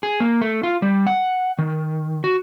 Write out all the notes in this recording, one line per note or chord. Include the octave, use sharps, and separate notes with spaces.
G#4
A#3
A3
F4
G3
F#5
D#3
F#4